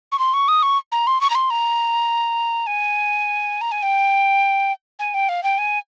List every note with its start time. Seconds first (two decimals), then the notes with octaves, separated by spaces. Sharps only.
0.12 C#6
0.19 C6
0.34 C#6
0.48 D#6
0.63 C#6
0.92 A#5
1.07 C6
1.21 C#6
1.30 A#5
1.35 C6
1.50 A#5
2.67 G#5
3.61 A#5
3.72 G#5
3.83 G5
4.99 G#5
5.14 G5
5.29 F5
5.43 G5
5.58 G#5